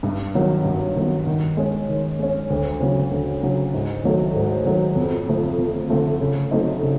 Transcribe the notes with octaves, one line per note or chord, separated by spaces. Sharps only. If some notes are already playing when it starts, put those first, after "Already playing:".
G2
D#3 F#3 B3
G2
D#3 F#3 B3
D#3
G#3 C#4
D#3
G#3 C#4
D2
C#3 F#3
D2
C#3 F#3
G#2
D#3 F#3 A3
G#2
D#3 F#3 A3
F2
D3 F3 A3 C4
F2
D3 F3 A3 C4
C#3
F#3 A3 C4 D#4
C#3